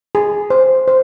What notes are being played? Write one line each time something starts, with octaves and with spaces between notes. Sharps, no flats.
G#4
C5
C5